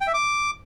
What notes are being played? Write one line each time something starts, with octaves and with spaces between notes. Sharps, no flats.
G5
E5
D6